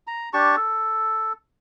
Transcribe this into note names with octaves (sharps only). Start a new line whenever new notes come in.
A#5
D4 G4 A5 C#6
A4